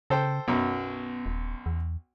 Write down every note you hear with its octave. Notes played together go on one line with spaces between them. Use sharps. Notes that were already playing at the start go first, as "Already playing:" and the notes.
C#3 A4 C5 G5
B1 F#2 B3
D#1
E2